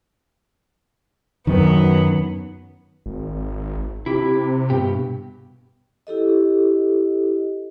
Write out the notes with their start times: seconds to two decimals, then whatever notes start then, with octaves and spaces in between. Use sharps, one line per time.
1.47 F#2 D#3 F#3 B3
3.06 G#1
4.06 C3 E4 G4
4.70 G2 B2 G4
6.07 E4 G4 A4 D#5